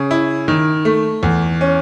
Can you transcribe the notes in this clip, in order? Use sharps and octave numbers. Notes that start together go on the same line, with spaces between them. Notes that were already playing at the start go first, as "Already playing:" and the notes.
Already playing: C#3
E4
D#3
A3
E2
C#4